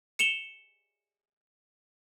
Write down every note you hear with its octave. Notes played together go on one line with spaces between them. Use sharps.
C#7 E7 F7 G7